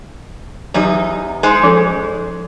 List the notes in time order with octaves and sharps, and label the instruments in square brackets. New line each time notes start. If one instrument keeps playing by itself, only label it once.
[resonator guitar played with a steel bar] E2 D#4 [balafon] F#3 G4
[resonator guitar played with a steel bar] G#3 D#4 C5
[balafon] F3 C#4 A4